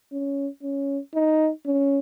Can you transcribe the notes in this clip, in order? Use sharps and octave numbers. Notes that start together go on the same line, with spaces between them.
C#4
C#4
D#4
C#4